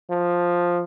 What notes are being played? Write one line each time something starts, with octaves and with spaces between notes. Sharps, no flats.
F3